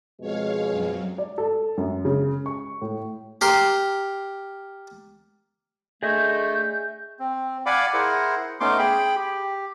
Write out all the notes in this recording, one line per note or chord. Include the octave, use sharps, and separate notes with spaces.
F2 B2 G#3 C#5 F5
F#2 F#3
D5
A4
F#2
C#3
C#6
A2
G4 A#4 C6
D3 A3 G#4 D#5 E5 G6
C4
D5 F5 F#5 G#5 B5 D6
E4 G#4 A#4 C5 F#5
A3 B3 C#4 D#4 C6 D6
G#4 G5 B5
G4